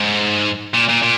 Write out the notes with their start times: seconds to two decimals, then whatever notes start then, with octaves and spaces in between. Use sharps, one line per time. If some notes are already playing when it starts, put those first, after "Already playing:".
Already playing: G#2
0.74 A#2
0.88 A#2
1.03 A#2